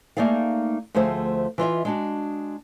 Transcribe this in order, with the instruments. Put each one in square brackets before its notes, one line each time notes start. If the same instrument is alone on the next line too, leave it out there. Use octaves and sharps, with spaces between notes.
[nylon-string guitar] A3 A#3 D#4 G#4 D5 F5
D2 F3 A3 G#4 C5
E3 F4 D#5 E5
G#3 D4 F#4